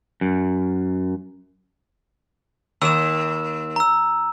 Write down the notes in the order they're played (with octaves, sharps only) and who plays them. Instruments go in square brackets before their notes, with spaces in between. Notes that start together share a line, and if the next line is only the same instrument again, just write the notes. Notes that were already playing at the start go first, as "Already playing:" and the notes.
[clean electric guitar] F#2
[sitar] D#2 [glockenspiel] E6 E7
[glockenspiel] A#5 E6